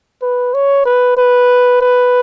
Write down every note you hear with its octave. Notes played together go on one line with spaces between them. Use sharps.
B4
C#5
B4
B4
B4